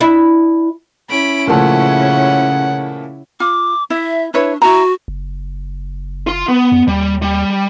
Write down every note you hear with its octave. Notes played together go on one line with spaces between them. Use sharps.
D4 E4
C#4 E4 B5 D7
A#2 C#3 F3 A3 F#5
F4 D6
E4 E5
D4 E4 B4 C#5
E4 F#4 A#5
F#1
F4 C6
B3
F#2
D#2 G3
G3